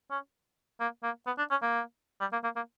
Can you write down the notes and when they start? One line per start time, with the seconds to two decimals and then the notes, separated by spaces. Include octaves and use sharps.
0.11 C#4
0.80 A#3
1.03 A#3
1.27 B3
1.38 D4
1.51 C#4
1.63 A#3
2.21 G3
2.33 A#3
2.44 A#3
2.56 A#3